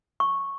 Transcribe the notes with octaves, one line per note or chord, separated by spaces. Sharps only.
C#6